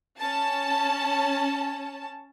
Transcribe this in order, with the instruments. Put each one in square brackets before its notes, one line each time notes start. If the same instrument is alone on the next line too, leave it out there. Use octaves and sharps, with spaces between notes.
[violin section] C#4 A5